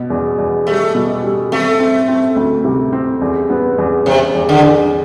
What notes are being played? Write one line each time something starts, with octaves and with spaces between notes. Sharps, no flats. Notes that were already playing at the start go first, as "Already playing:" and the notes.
Already playing: B2
E2
E2
G3 A3
B2
G3
A3 C4
C4
C4
D2
C3
C4
E2
B3
E2
E2 C3
E2
D3
E2